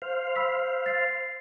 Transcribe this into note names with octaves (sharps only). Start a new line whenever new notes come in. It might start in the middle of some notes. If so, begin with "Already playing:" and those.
C5 F5
B5 E6 B6
A6 C7